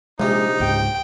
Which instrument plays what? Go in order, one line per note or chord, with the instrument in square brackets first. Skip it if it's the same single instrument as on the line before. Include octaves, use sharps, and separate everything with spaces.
[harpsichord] A#1 C3 [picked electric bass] G#3 [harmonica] D#4
[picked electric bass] C#2 G#2 [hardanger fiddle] G5